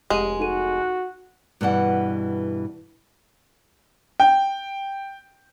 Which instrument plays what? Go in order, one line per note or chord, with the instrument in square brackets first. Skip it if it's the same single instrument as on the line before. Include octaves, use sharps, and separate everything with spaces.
[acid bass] F1 [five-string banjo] G#3 [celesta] G4 F#5 D#7
[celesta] D#4 A4 D#7 [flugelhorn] F#4
[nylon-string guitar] G2 B2 E3 F#5
[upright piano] G5